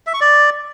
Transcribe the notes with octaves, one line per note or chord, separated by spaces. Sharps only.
E5
C#6
D5